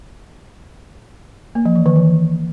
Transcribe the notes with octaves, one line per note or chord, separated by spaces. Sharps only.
A#3
F3
E3
D#3
E3